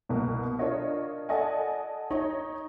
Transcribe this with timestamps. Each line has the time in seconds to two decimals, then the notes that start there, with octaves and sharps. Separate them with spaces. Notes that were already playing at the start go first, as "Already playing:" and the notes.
0.09 C2 B2 A#3
0.59 D4 F4 A#4 C#5 D#5
1.29 A4 D5 D#5 F#5 G#5
2.11 D#4 C#5